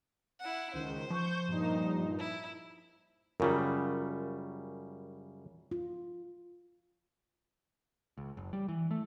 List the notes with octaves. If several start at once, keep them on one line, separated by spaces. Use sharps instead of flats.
E4 F#5
C#2 D#3 C5
F3 C#6 G6
G2 A#2 D#4
E4
F#2 C#3 G3 F4 A#4
F4
C#2
F#1
G3
E3
A3